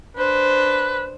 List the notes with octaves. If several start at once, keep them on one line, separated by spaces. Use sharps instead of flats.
D4 B4 C5